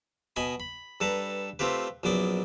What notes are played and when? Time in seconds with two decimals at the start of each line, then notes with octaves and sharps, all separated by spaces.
0.36 B2 D#5 G#5 B5
0.60 B5
1.00 G2 A4 B4 A5 A#5
1.59 A3 C4 F4 G4 B4
2.03 A#1 F#2 F#3 B3 D5